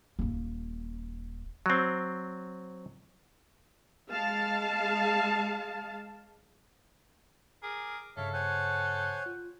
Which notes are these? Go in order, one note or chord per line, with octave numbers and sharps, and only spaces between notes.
D#1 A#3
F#3 C4
G#3 F5 A5
G#4 A#4 D6
G2 C#3 A4 C#5 E5 F5
C5 C#5 F#5 G#5
F4